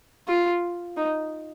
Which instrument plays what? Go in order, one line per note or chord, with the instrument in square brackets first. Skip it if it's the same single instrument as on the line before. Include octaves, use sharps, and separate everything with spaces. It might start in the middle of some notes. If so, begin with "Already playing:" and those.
[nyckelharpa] F4
D#4